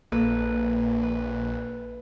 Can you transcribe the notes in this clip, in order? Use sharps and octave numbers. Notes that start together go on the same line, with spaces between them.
A#1 A#3 A4 B4
B4